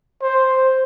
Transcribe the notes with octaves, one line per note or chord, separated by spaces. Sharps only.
C5